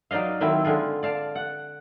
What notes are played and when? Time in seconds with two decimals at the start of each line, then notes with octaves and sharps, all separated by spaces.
0.11 F#3 D#4 D5 D#5 F5
0.41 D#3 F#3 C4 E4
0.64 D3 G#3 F4
1.03 D5 F5 A5
1.35 F#5